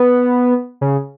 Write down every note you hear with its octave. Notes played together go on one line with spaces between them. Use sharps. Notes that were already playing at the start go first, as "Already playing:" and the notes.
Already playing: B3
C#3